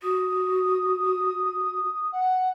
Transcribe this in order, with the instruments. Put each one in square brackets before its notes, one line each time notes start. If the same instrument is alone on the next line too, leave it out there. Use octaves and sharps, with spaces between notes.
[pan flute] F#4 [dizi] D#6
[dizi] F#5